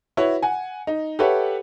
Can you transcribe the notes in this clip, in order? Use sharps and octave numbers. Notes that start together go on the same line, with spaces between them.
E4 F#4 B4 C#5
F#5 G#5
D#4
G4 A4 B4 C#5 E5 F#5